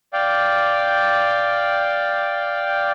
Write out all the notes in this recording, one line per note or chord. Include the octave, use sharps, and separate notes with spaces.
D5 F5 G5